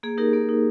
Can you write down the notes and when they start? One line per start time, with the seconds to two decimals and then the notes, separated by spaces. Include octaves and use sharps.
0.03 A#3 G#4
0.18 D#4 G4 A#4
0.33 A#3
0.49 D#4